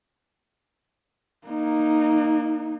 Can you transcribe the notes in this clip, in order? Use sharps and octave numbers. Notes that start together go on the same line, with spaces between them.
A#3 D#4